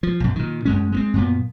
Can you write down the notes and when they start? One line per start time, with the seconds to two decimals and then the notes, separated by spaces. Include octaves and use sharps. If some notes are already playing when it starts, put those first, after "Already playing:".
0.03 F3
0.20 B1 F#2
0.36 A#2 D#3
0.65 F#2 G#3 C#4
0.92 G#3 A#3 C4
1.14 F#2 A#2 B3